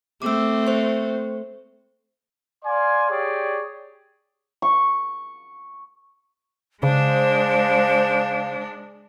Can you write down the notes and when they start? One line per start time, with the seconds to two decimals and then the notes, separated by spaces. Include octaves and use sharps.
0.22 A3 C4 D6 E6
0.67 C5 C#6
2.65 D5 F5 G#5 C6
3.10 G4 G#4 C#5 D5
4.62 C#6
6.83 C#3 G#3 D4 C5 F5